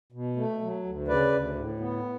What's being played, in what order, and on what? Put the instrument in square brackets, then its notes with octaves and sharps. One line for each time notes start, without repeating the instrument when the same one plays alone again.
[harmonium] B2
A3
F#3
D2
C#3 B4 D5
D2
A2
B3